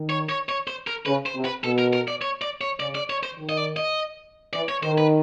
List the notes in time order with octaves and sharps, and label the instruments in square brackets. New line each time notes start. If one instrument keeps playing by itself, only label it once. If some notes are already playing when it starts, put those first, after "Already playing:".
Already playing: [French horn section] D#3
[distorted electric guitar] C#5
C#5
C#5
C5
A#4
[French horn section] C#3 [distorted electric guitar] B4
[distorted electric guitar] C5
[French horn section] C3
[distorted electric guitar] B4
[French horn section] B2 [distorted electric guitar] A4
[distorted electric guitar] A#4
A#4
D5
C#5
D5
C#5
[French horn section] C#3 [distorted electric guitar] D5
[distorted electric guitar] D5
C#5
C5
[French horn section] D#3
[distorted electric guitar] D#5
D5
D#5
[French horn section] E3 [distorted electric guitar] D5
[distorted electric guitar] C#5
[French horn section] D#3 [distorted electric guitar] C5
[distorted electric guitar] B4